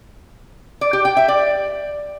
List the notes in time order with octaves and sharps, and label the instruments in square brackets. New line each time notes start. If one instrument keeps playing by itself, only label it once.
[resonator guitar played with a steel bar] D5
G4
G5
E5
D5